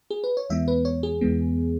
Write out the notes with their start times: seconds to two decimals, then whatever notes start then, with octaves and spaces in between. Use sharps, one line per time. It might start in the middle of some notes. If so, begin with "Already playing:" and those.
0.10 G#4
0.24 B4
0.37 C#5
0.50 E2 E3 G#3 B3 E5
0.68 B4
0.85 C#5
1.03 G#4
1.21 E2 E3 G#3 B3